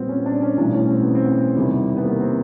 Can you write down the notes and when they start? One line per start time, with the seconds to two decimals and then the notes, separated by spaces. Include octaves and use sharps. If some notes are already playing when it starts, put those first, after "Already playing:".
Already playing: A#1 A#2 G3 B3 C4
0.09 C#4
0.26 D4
0.42 C#4
0.57 B1 A2 E3 G3 D4
0.73 C#4
0.90 C4
1.02 B3
1.15 C4
1.55 E2 C3 D#3 G3
1.96 B3
2.04 A#3
2.20 C4